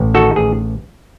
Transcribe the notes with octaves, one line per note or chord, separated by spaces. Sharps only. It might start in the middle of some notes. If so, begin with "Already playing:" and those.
Already playing: A1
D#3 F#4 A4
A1 G#4